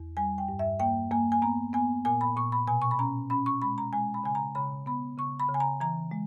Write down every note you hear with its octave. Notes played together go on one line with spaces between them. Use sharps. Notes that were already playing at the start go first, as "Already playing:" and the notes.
Already playing: E2
G3 G#5
G5
G2
E5
A#3 G5
A#3 G#5
G#5
B3 A#5
B3 G#5
A#2 G#5
B5
A#2 C#6
B5
B2 G#5
C#6
B5
C#4 A#5
C#4 B5
C#6
G#3 B5
A#5
G#3 G#5
B5
C#3 G#5
A#5
C#3 B5
B3 B5
C#3 C#6
B5
C#3
G#5
A#5
E3 A#5
G#3